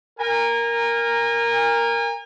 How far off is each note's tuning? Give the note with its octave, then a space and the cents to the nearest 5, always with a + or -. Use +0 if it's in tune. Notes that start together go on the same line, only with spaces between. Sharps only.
A#4 +0 G#5 -35